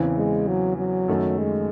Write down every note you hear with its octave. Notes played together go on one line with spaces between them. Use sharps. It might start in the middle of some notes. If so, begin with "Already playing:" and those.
Already playing: E2 C#3 E3 C4
G#3
F#3
F#3
F#2 D#3 A3
G#3